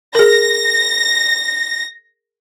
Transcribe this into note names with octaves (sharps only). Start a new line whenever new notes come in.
G#4 A#4 A#6